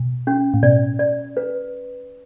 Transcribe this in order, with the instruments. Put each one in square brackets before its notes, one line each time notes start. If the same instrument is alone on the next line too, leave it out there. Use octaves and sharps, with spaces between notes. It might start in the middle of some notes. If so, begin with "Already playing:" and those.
Already playing: [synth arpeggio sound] B2
[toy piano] C#4
[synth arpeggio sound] A2
[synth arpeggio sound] B2 [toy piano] D5
[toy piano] D5
B4